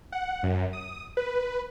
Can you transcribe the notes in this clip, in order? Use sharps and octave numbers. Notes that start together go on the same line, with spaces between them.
F#5
F#2
D#6
B4